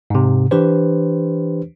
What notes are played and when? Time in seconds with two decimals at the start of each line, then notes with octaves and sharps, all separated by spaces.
0.10 G#2 C3
0.51 E3 D4 G4 B4 C5